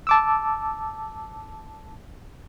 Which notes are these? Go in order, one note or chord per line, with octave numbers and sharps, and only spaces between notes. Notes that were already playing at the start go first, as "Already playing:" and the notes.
A5 D6 E6